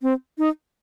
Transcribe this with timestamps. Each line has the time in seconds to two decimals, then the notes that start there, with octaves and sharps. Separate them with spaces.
0.02 C4
0.38 D#4